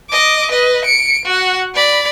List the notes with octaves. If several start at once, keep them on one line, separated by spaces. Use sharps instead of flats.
D#5 D6
B4 D#5
C#7 D7
F#4 F#5
D5 B5